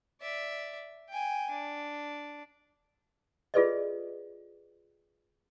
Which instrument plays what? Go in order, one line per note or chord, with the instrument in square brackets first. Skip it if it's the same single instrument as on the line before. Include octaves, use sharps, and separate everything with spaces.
[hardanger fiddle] D5 E5
G5 G#5
D4
[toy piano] F4 G#4 A4 B4 D5 D#5